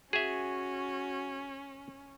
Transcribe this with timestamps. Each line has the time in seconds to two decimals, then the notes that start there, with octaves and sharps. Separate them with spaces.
0.13 C#4 F#4 G#4 E5